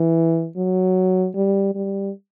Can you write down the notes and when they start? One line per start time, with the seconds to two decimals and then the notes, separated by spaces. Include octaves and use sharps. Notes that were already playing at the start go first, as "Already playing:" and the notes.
Already playing: E3
0.57 F#3
1.35 G3
1.75 G3